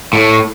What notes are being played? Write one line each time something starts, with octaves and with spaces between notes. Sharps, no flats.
A2